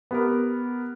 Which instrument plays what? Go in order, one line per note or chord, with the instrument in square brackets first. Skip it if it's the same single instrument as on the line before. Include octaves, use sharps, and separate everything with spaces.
[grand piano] B3 G4 A#4